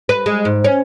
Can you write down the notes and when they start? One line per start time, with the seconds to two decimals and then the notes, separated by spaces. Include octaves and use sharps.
0.09 B4
0.26 G#3
0.45 G#2
0.64 C#4